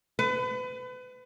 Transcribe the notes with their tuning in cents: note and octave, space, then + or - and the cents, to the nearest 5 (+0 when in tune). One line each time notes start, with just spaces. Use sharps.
B4 +35